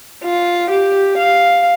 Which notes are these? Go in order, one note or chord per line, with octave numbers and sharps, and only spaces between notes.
F4
G4
F5